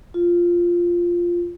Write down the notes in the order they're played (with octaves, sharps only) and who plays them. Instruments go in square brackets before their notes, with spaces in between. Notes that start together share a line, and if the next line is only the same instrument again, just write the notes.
[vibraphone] F4